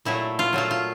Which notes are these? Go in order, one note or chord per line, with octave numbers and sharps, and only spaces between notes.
A#2 F#3 A3 E4
F4
A#2 F#3 A3 F4
F4